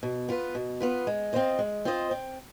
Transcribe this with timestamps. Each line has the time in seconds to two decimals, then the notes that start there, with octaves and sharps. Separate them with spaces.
0.03 B2
0.29 B3 F4 B4
0.55 B2
0.80 B3 F4 B4
1.07 G#3
1.33 C4 F4 C5 D#5
1.59 G#3
1.85 C4 F4 C5 D#5
2.11 C4